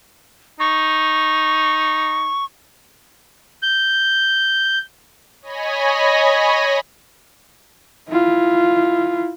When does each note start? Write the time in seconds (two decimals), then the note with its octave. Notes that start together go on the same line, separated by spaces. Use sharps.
0.60 D#4 C#6
3.63 G6
5.42 C#5 D#5 G#5 B5 A#6
8.09 E4 F4